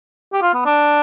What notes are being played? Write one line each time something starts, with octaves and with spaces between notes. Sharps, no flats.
G4
F4
B3
D4